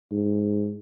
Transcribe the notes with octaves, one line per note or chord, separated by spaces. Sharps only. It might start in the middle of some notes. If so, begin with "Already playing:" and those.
G#2